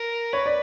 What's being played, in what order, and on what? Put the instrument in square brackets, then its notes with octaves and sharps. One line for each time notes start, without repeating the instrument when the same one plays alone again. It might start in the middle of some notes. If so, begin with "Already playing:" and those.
Already playing: [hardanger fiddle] A#4
[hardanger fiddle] B4 [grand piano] C#5
[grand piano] D5